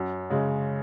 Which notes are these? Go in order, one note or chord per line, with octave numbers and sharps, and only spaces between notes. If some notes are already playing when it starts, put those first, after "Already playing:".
Already playing: F#2
C#3 G#3